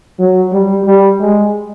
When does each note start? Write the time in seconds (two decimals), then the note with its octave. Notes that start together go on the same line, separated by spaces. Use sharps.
0.19 F#3
0.53 G3
0.86 G3
1.20 G#3